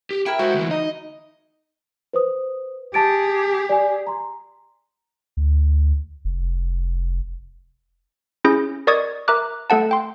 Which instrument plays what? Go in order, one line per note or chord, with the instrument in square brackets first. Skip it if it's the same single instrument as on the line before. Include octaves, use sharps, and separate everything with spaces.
[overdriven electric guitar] G4
[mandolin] E4 A#4 [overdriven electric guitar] G5
[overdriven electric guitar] G#3 C5 [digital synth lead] F#4
[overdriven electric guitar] D2 E3
[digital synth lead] D#4 [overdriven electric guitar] D#5
[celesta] B4 C5 D#6
[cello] G4 G#4 [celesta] A5 A6 D7
[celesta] D5 G#5
A#5 C6
[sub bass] D2
F1
[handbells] C#4 E4 G#4 G6 A#6
A#4 D5 D#5 C#6 D#6 G#6
A#4 E5 A#5 D6 F#6
A3 A4 F#5 A5
G5 C6